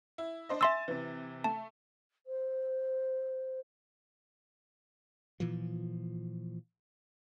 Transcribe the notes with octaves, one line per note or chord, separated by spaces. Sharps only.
E4
D4 C5 D#5
E5 G#5 C6 E6 A6 E7
C3 E3
A3 A5
C5
A#2 E3 F3